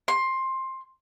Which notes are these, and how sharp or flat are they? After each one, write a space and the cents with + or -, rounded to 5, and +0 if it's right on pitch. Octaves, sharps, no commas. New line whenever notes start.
C6 +15